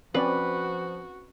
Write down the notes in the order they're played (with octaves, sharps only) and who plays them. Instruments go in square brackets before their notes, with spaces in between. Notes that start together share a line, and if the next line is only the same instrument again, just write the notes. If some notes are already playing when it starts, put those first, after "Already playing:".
[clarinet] F3 [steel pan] C4 C#4 D5 [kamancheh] F#4 [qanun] B4